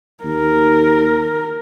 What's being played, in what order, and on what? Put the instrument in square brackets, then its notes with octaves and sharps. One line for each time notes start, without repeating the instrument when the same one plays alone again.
[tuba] D#2 [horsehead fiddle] A#4